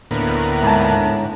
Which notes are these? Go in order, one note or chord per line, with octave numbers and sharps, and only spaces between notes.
D2 A2 A#3 B3
G#2 A5 A#5